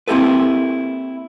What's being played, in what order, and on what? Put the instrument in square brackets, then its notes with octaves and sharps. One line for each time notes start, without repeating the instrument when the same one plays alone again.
[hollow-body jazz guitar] A#3 C4 E4 G4 A4 B4